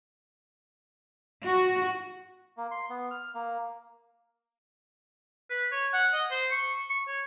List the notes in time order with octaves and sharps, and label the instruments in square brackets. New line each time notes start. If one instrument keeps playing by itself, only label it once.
[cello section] F#4
[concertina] A#3
C6
B3
F6
A#3
[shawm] B4
C#5
F#5
D#5
C5
C#6
C#6
C#5